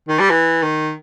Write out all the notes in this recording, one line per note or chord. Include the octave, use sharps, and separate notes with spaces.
D#3
G3
E3
D#3